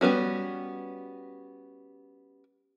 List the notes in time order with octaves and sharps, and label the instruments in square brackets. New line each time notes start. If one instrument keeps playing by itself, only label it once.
[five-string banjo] G3 B3 C#4 F#4